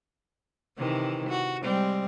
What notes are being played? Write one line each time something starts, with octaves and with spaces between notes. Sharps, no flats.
C3 D#3 E3
F#4
G3 G#3 C4